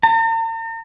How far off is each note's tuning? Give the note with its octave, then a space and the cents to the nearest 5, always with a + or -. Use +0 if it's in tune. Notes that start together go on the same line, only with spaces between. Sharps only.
A#5 -45